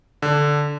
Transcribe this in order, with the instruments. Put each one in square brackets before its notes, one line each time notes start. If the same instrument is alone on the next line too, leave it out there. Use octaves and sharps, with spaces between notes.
[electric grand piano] D3